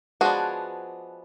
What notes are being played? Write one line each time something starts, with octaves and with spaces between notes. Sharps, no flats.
F3 G#3 B3 D4 F#4 G#4